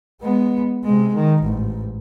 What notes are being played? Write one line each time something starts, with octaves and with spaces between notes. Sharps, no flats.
G#3 B3
C3 G#3
D#3
A1 G#2